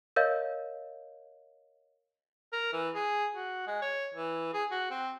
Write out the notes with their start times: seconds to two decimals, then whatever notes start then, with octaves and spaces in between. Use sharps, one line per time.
0.16 A#4 C#5 D#5 F5 G6
2.53 A#4
2.73 E3
2.94 G#4
3.35 F#4
3.67 G#3
3.82 C#5
4.15 E3
4.53 G#4
4.71 F#4
4.91 C4